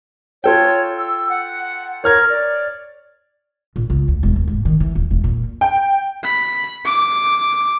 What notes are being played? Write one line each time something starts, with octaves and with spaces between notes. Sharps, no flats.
F4 A4 C#5 G5
E6
F#5
A#4 C#5 F6 G#6
D5
A#1
C#2
D2
E1
D#2
G#2
D#3
E3
D#1
E1
A#2
G5
B5
D6